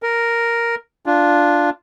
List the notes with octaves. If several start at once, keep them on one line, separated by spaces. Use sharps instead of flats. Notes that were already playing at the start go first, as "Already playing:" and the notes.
A#4
D4 F4